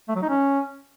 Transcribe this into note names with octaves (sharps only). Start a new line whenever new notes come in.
A3
F#3
D#4
C#4